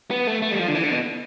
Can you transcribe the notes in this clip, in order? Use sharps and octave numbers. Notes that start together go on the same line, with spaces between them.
B3
A3
A3
G3
F3
D3
E3
D3
B2